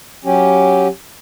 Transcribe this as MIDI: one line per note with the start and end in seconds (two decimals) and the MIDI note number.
0.25 0.88 54
0.25 0.88 61
0.25 0.88 67